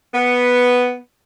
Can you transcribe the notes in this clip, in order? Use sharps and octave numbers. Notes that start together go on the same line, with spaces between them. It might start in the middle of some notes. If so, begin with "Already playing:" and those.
B3